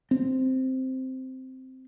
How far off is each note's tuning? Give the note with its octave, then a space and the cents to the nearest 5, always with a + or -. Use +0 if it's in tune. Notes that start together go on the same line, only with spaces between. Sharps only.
C4 -5